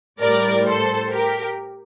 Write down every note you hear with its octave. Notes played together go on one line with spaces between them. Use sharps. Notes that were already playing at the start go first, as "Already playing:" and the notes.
A2 G3 A#4 D5
A4 C5
G4 A#4